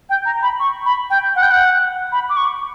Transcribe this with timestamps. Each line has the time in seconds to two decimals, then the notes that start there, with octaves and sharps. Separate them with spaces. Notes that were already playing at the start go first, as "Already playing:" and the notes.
0.10 G5
0.25 A#5
0.43 B5
0.60 C#6
0.86 B5
1.10 G5
1.36 F#5
1.43 G5
1.51 F#5
2.12 B5
2.29 D6
2.37 C#6